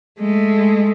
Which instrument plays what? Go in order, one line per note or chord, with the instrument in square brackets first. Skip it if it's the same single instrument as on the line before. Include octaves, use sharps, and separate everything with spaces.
[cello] G#3 A3